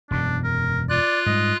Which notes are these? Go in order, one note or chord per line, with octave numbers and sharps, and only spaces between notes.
E1 F#2 B2 D4
A#4
F4 D5 F#6
G#2 G3 D#5